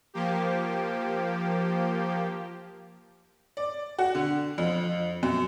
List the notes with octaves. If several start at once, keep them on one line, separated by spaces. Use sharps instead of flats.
F3 A#3 G4
D5
F#4
D3
F2
F#2